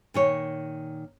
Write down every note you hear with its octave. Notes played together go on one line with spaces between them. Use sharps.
A#2 D#3 C#5